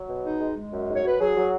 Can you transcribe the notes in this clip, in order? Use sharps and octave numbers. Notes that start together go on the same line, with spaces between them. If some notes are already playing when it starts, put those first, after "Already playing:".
Already playing: F#3
B2
G#3 D#4
G#3
G#3
F#2
G#2 C#5
F#3 B4
F#3 G#4
F#3